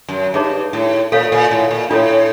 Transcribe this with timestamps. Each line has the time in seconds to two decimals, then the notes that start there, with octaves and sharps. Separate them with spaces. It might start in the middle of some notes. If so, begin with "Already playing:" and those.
0.09 F#2
0.34 G2 D#4 G#4 C#5
0.73 A2
1.12 A#2 A4 C#5 F5
1.32 A#2
1.51 A2
1.71 A#2
1.90 A2 D4 F4 A4 C#5